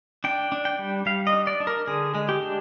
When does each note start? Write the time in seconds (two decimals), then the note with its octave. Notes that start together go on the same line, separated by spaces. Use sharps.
0.24 D4 G5
0.52 D4
0.65 G5
0.79 G3
1.06 G3 F5
1.27 D#5
1.33 D4
1.47 D5
1.60 D4
1.67 A#4
1.87 D3 G#4
2.15 G#3
2.29 G4
2.42 D4